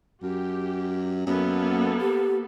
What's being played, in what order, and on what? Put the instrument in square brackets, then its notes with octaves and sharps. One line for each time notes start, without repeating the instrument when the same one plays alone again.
[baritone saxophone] F#2 [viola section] G4
[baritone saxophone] F#2 [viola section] A#3 B3 A4
[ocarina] G4